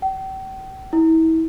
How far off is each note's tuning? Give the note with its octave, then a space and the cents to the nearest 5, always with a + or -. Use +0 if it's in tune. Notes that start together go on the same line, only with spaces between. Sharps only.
G5 -40
E4 -35